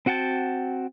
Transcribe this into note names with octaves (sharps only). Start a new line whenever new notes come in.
C4 F#4 F#5 G5 A5